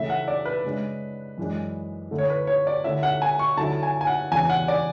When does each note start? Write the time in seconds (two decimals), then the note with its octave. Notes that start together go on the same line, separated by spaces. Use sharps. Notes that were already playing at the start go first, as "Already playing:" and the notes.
Already playing: C#3 E3 A3 E5
0.10 F#5
0.28 D5
0.45 B4
0.64 C#3 G#3 D4
1.38 F#2 E3 G#3 D4
2.11 D3 A3 E4
2.18 C#5
2.30 B4
2.47 C#5
2.67 D5
2.84 D3 A3 C#4 E4 E5
3.03 F#5
3.22 G#5
3.39 C#6
3.57 D3 F#3 C#4 E4 A5
3.83 G#5
4.01 G#5
4.07 F#5
4.32 E2 C#3 E3 B3 D4 G#5
4.50 F#5
4.68 D5